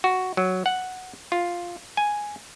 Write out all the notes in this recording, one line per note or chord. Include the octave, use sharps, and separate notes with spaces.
F#4
F#3
F#5
F4
G#5